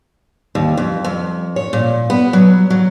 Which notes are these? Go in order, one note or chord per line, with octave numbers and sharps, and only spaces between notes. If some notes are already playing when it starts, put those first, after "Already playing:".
D#2
F2
F2
C#5
A#2
B3
F#3
F#3